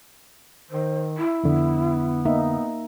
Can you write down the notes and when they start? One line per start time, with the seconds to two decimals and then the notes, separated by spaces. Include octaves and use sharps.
0.71 D#3 C5
1.18 E4
1.44 F2 D3 B3
2.25 A#3 D#4 E5